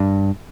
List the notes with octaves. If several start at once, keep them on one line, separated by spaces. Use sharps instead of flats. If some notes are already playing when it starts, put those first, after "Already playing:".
Already playing: G2